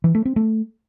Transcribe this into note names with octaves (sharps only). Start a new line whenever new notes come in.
E3
A3
C4
A3